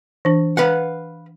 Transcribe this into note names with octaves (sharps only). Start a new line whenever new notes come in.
E3 D4
B4 F5 F#5